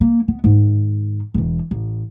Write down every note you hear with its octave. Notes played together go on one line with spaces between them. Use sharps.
A#3
B3
G#2 D#3
E1 E3
A1